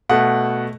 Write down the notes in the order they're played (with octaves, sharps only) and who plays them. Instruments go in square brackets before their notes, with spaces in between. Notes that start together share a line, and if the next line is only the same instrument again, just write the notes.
[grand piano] B2 A3 F#5